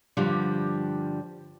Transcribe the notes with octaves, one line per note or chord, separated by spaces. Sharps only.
G2 D3 F3 G3